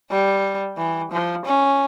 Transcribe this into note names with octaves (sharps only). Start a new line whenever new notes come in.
G3
E3
F3
C#4